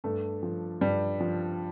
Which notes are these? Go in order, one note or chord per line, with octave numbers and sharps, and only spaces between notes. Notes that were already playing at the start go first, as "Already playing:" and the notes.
G2 A3
F3
G2 G3
F3